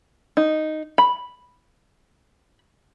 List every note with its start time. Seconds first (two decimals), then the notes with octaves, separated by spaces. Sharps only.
0.37 D#4
0.98 B5